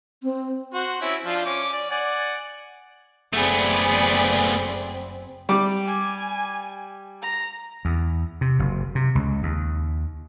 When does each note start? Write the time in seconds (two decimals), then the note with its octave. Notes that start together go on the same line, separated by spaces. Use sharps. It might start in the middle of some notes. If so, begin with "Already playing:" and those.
0.23 C4
0.74 F#4 C5
1.01 C4 C#4 E4
1.25 F3 D4 F4
1.45 C#4 D6
1.73 D5
1.90 D5 F#5 G#5
3.34 F#1 A3 B3 C4 G#4 D5 B5
5.49 G3 D6
5.87 G#5
7.22 A#5
7.85 E2
8.41 C3
8.59 F#1
8.95 C3
9.15 C#2
9.43 D#2